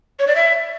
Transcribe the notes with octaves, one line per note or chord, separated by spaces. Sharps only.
C#5
D5
E5